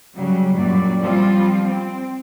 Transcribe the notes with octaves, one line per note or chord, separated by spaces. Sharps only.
C#3 F#3 G3
F#2 A#2 F#3 G3 D5
F3 G3 C4 F4
C4